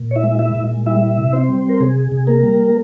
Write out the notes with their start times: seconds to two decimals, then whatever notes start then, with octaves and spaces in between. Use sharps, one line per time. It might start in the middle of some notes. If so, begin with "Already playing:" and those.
Already playing: A#2
0.11 C#5
0.16 E4 E5
0.24 G#3
0.39 E4 E5
0.55 A#2
0.86 G3 E4 E5
1.17 C3
1.33 C4 C5
1.49 G3
1.69 A#4
1.80 C3 G#4
2.12 C3
2.27 A#3 A#4
2.43 G3